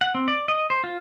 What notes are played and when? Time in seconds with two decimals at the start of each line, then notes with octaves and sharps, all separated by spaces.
0.01 F#5
0.15 C4
0.28 D5
0.48 D#5
0.70 C5
0.84 F4